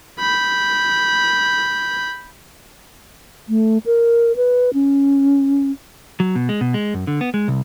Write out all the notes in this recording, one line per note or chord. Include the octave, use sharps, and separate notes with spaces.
B5 G6
A3
A#4
B4
C#4
F#3
B2
G#3
B2
G#3
F#2
D3
B3
G#3
C2